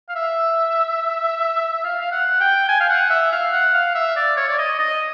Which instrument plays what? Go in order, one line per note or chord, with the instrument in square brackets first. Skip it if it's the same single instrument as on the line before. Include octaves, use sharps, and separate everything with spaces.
[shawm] F5
E5
E5
F5
F5
F#5
G5
G#5
F5
F#5
E5
F5
F#5
F5
E5
D5
C#5
D5
D#5
D#5